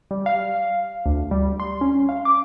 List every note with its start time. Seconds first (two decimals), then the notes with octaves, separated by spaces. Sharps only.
0.11 G3
0.26 F5
1.06 D2
1.31 G3
1.60 C6
1.81 C#4
2.09 F5
2.25 D6